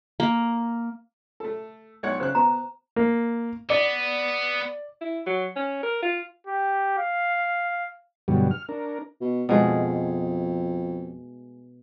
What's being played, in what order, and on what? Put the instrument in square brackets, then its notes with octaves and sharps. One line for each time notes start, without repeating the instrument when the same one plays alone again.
[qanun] A#3
[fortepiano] A3 A4
B1 C#5 F#5
[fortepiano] C#3 F#6 [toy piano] C5
[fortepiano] B3 [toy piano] A#5
[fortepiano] A#3
[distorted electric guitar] B3 [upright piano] D5
[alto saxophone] E4
F#3
C#4
A#4
F4
[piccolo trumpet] G4
F5
[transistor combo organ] G2 B2 D3 F#3 G3
F6
D4 A#4
[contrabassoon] B2
[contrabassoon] F2 [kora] B2 G#3 A3